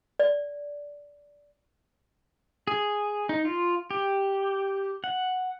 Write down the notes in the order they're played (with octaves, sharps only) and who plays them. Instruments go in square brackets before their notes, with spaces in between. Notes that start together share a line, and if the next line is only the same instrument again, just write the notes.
[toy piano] D5
[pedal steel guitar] G#4
D#4
F4
G4
F#5